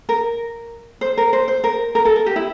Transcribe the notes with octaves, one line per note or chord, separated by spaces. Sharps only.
A#4
C5
A#4
C5
C5
A#4
A#4
A4
A#4
G4
E4